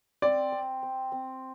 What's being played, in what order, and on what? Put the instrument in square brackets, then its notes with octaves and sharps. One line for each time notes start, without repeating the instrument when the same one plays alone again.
[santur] C4 [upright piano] D5
[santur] C4
C4
C4